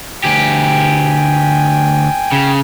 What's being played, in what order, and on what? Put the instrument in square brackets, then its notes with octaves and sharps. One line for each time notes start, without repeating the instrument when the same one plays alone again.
[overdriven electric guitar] D2 G4 [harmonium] G5 G#5
[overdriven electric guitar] C#3